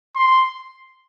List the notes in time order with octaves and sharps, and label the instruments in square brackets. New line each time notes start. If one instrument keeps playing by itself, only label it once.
[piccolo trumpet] C6